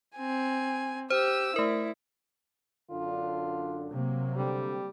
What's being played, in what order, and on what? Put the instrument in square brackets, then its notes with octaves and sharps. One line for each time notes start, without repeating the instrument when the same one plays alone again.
[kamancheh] C4 G#5
[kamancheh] G4 E6 [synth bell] C5
[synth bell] A3 A#4 [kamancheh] E4
[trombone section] F#2 D3 D4 [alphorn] F4
[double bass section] C3 F#3 A#3
[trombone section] D3 C4 [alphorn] G3